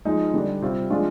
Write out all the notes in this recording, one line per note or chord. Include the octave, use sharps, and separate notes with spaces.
F3 G#3 D#4
D3 G3 D4
C3 G3 C4 F4
F3 G#3 D4 F4